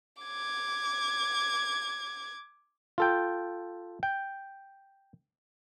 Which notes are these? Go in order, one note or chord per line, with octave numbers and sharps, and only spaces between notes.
D6 G#6
F4 A4 G5
G5